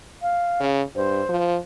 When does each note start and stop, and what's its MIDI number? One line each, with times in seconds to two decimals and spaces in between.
0.22 0.68 77
0.60 0.82 49
0.96 1.22 43
0.96 1.42 72
1.29 1.57 53